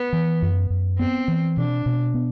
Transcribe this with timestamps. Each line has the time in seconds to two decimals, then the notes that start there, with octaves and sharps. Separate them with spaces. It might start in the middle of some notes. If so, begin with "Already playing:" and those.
Already playing: B3
0.13 E3
0.42 F#2
0.70 F#2
0.99 B3 C4
1.28 E3
1.57 B2 D4
1.86 B2
2.14 B3